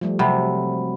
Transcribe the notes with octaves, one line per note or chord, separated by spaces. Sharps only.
F3 G3 A3
C3 F#3 F#5 B5